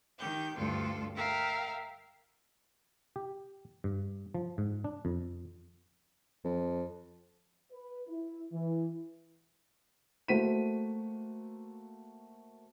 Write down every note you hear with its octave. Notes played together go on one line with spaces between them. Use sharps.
D#3 G4 G6
D2 G2 F4 A4
A#4 E5 F5 G5 A#5
G4
G2
F3
G#2
D4
F2
F2
B4
E4
E3
A3 A#3 F#4 C5 B6 D#7